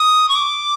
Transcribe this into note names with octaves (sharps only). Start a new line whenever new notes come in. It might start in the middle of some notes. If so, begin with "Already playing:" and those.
Already playing: D#6
C#6
D6